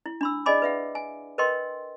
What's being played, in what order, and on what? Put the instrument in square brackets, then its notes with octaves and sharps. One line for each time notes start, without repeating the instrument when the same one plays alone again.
[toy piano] E4
D4 B5 E6
G#4 D5 D#5 G#5 B5 D6
B4 E5 F#5
G#5
A#4 B4 D#5 G5 C6